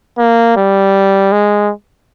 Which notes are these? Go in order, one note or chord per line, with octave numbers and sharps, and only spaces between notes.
A#3
G3
G#3